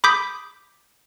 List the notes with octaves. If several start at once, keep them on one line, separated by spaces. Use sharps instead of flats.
B5 D6 D#6 G6 B6